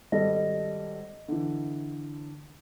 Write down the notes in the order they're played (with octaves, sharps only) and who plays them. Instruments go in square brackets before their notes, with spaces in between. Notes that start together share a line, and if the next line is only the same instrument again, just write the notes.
[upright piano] G#1 G3 A4 [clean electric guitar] D#5
[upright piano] D3 E3